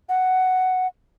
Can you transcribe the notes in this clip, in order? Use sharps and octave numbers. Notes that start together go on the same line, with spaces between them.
F#5